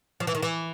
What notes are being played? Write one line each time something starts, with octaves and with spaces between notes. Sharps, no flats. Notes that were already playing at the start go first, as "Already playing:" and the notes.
F3
E3
D#3
E3